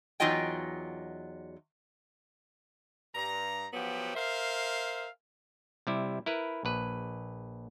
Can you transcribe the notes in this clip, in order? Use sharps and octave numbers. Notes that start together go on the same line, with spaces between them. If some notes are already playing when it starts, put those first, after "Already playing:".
E2 F#3 D#4 F4 D#5 G5
G2 A#5
F3 F#3 B3 G4
A#4 C5 E5 F5
C3 G3 E4
E4 A#4 B4
A#1 B4